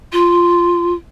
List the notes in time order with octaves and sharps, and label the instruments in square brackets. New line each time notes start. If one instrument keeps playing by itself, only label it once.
[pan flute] F4